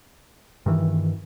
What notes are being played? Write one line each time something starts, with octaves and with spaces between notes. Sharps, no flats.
G2 D#3 E3